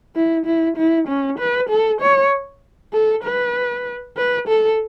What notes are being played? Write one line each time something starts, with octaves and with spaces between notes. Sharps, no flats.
E4
E4
E4
C#4
B4
A4
C#5
A4
B4
B4
A4